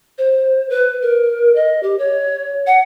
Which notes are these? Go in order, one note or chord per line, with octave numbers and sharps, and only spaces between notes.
C5
B4
A#4
D#5
G4
C#5
F#5